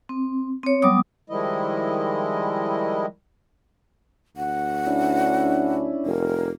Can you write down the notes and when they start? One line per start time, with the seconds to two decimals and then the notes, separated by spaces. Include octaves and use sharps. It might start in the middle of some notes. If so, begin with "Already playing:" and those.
0.09 C4
0.63 C4 C#5
0.82 F#3 G3 B3 D6 D#6
1.30 D#3 F3 G3 G#3 E4 D#5
4.37 D2 F#5
4.87 C#4 D4 E4
6.06 F1 A#4